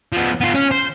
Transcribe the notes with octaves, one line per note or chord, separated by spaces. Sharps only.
F3 B3
B3 F4
C#4
C5